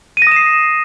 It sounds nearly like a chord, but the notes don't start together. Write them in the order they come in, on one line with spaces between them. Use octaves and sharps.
D#7 A#6 D#6 E7 C7